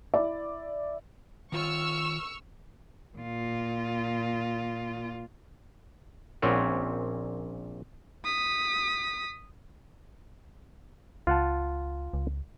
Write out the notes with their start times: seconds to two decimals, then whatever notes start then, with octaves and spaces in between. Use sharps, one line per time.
0.14 E4 D5 E5
1.52 D#3 F4 C#5 C#6 E6 F6
3.18 A#2 F4
6.42 A#1 A#2 C4 C#4 C#5 F#5
8.25 D#6 B6
11.27 C#2 F4 F#5 A5
12.14 C#2